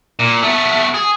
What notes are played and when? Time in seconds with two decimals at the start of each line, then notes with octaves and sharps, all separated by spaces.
0.19 A#2
0.42 A3 B3
0.95 G#4